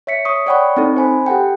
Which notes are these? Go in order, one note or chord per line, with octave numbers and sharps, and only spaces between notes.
C#5 E5 B6 C#7
C#5 C#6 D#6
C#5 D5 F#5 G5 B5 C#6
C4 D#4 A4
C5 G#5 B5
G4 A4 F#5 G5